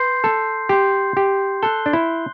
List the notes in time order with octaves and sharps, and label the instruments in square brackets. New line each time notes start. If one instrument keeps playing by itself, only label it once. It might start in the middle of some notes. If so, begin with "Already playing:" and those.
Already playing: [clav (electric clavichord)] B4 [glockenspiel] C6 G6 C7
[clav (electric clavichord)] A4
[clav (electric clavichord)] G4 [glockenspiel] C6 G6 C7
[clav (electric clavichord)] G4
[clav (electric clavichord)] A4 [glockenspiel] F#6 C7 G7
[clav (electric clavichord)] D4
E4